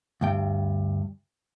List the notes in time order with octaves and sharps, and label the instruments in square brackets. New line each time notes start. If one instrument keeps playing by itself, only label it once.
[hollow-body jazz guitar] D2 G2 G5